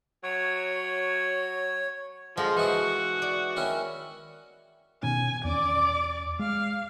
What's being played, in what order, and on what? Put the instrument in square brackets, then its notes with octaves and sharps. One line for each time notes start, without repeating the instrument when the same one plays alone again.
[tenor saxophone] F#3 [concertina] C#5
[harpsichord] D3 [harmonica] F3 [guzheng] G#3
[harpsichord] E3 D#4 E4 [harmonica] F#4
[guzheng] D5
[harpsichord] D#3 C#4 E4
[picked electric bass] B2 D#3 C#4 [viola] G#5
[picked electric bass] E2 C4 C#4 [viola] D5 D6
[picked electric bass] G#3 [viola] F5